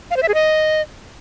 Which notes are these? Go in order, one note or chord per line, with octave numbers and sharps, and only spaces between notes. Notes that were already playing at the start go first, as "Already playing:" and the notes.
F5
C5
E5
G#4
D#5